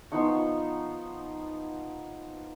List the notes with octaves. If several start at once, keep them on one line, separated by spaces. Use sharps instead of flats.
F3 B3 D#4 C#6